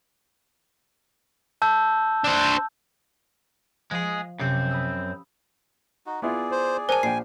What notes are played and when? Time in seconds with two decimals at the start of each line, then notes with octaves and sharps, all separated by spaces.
1.62 A5 E6 G6
2.24 D4 C5
3.91 F3 G#3 G#4
4.40 F#2 C3 C4 C#4 G4
4.71 B5 D#6 E6
6.06 D#4 F#4
6.22 B3 E4 F4 G#4 D5
6.52 C5
6.89 A#4 C5 G#5 A5
7.03 A#1 D5 F5 G5 C7